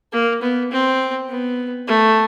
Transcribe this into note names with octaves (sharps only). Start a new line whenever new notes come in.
A#3
B3
C4
B3
A3